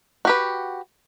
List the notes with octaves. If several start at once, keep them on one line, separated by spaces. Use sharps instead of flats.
F#4 G4 B4